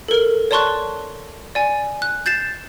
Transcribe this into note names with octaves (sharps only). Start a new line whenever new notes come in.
A4 A#4
C#5 D5 A5 C6 C#6 F#6
D5 G#5
F#6
G6 A6 C7 E7